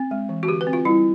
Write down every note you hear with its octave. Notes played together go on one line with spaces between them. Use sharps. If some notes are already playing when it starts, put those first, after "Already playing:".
Already playing: C4
G#3
E3
F#4
D3 G4
B4
C4
F4
G3 E4